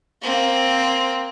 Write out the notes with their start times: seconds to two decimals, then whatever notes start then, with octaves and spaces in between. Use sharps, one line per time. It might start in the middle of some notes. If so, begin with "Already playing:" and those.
0.22 A#3 C4